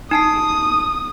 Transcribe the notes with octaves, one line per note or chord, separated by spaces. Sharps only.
D#4 A5 D#6 C7